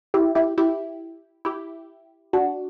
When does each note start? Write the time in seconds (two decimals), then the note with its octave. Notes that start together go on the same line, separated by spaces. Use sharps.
0.14 E4 G4
0.35 E4 G4
0.58 E4 G4
1.45 E4 G4
2.33 D4 F#4